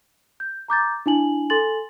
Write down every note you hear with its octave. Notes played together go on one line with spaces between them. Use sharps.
G6
A#5 D6 G6 A6
D4 E4 G#5 F#7
A4 G#5 C6 A6 F#7